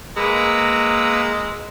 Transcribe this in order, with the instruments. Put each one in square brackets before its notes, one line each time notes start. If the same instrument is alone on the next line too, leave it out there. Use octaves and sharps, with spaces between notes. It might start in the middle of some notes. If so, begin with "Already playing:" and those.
[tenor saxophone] G#3 [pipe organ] A#3 B4 [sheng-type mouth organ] A#5 E6